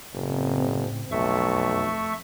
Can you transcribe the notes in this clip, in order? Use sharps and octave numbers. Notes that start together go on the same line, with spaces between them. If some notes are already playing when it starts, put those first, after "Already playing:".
F#1 A2 C#3 C4
B1 F2 A3 E5 C#6